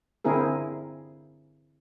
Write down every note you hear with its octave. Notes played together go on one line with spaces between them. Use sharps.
D3 C4 E4 G#4 A#4